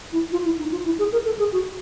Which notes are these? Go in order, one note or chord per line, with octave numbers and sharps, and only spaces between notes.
E4
F4
E4
D#4
F4
E4
G#4
A#4
A4
G#4
F#4